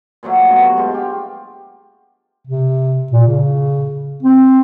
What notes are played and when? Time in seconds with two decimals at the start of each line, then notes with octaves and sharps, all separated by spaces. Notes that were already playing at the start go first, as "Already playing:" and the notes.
0.23 A#2 F3 F#3 A3
0.48 G2 B2 F#3 F#4
0.76 G#3 F4 C5
0.94 G4
2.47 C3
3.12 A#2
3.27 C#3
4.22 C4